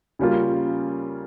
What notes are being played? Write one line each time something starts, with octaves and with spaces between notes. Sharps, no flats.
C#3 G3 A#3 C#4 F4